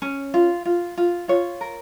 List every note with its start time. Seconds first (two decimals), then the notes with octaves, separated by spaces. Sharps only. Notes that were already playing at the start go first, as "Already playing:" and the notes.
0.02 C#4
0.34 F4
0.65 F4
0.97 F4
1.28 F4 C#5
1.61 A#4